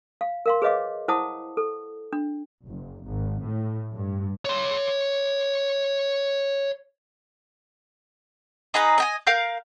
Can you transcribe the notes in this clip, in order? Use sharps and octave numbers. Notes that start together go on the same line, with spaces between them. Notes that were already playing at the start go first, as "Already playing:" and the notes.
F5
A#4 F5 C6
G#4 B4 C#5 D#5 F5 D6
E4 C5 F#5 A5 D6 D#6
A4
D4
F#1
G#1
A2
G2
C#5 C6
D#4 G#4 B4 A#5
D#5 G5 G#5
A#4 F5 G6